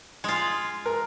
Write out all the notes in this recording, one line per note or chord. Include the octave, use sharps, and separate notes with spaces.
G#3 F4
A#4